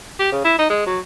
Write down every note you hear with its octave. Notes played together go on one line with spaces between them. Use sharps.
G4
C#3
E4
D#4
G#3
F#3